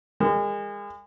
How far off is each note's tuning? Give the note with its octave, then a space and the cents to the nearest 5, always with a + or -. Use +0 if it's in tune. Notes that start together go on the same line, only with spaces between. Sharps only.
G#3 -35 A#4 -30